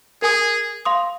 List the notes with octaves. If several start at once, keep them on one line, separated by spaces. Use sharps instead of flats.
G#4 A#4 G#5 D#6
F5 C6 D#6